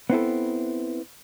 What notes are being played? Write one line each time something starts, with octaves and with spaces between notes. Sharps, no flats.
B3 C4 E4 A4